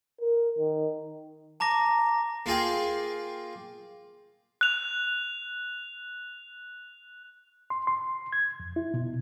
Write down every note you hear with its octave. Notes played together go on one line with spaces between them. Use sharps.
A#4
D#3
A5 A#5 D6 A#6
A#3 F4 G#4 G5
F#6 F7
C6
C6
G#6
F2
E4
B2